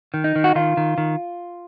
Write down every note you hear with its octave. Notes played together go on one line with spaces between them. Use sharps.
D#3
D#4
D#3
F#4
D#3 F4
D#3
D#3